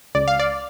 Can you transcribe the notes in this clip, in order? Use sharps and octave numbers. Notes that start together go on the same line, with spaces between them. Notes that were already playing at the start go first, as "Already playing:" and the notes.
C#2 D5
F5
D5